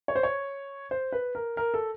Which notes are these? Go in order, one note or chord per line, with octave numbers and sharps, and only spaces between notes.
C#5
C5
C#5
C5
B4
A#4
A#4
A4